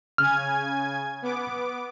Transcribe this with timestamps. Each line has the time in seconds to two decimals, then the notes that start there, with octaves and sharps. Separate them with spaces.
0.18 C#3 G#5 F6 G#6
1.22 B3 D6